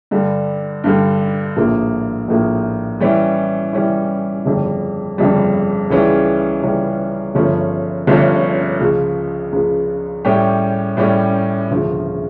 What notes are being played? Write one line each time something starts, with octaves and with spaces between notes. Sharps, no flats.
G2 D3 G3
G2 D3 G3
A#1 A2 F3 A#3
A#1 A2 F3 A#3
E3 G3 C#4 E4
E3 G3 C#4 E4
G1 F2 C#3 G3
G1 F2 C#3 G3
C#2 C#3 E3 G3 C#4
C#2 C#3 E3 G3 C#4
G1 G2 F3 A3 C#4
G1 G2 F3 A3 C#4
C#2 C#3 F3
C#2 C#3 F3
A2 G3 C#4 G4
A2 G3 C#4 G4
E1 D2 C#3 F3